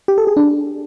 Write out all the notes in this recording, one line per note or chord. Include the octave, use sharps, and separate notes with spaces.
G4
A4
G#4
D4